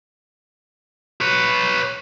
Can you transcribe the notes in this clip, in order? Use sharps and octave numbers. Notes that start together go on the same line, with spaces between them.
B4 C#5